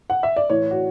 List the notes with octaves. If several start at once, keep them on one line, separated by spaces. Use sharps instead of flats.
F#5
E5
D5
A2 E3 C#5
F#4